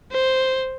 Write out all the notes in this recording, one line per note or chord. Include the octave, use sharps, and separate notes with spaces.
C5